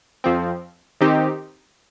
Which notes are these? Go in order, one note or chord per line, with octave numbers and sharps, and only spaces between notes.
F2 F3 C4
D#3 C4 D#4 G4